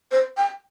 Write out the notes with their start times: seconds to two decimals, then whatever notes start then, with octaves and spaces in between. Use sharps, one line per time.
0.11 C5
0.37 G5